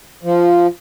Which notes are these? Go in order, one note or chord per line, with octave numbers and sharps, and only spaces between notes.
F3